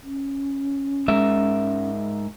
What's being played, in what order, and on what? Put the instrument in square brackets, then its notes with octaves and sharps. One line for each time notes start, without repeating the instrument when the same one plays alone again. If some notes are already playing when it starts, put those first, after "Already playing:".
[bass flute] C#4
[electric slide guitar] G#2 A#4 E5 [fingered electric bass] G#3